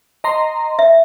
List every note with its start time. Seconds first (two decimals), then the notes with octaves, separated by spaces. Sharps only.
0.24 D#5 A#5 C6
0.79 E5